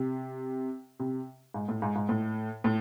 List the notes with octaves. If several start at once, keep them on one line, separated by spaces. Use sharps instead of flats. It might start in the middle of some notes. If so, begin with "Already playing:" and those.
Already playing: C3
C3
G#2
A2
G#2
G#2
A2
A2